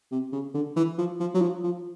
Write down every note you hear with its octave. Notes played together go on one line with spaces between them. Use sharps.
C3
C#3
D3
E3
F3
F3
F#3
F3
F3